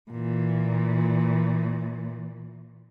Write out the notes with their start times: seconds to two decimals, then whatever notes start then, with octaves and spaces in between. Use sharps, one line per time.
0.11 A#2 E3